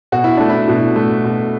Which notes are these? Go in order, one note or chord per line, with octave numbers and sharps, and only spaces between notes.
B2 F#4
E4
A3 D4
E4
B2
A3
B2